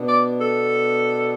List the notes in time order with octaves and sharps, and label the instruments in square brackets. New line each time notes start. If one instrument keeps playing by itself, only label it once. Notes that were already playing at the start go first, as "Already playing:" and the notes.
Already playing: [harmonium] B2 B3 D4
[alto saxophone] D5
A4